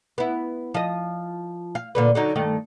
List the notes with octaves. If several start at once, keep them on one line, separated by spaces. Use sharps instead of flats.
B3 E4
F3 D#5
F5
A#2 D3 B4
D3 F#3 D#4
G2 D#3 A3